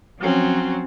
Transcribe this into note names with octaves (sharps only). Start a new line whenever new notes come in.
F3 F#3 C4 C#4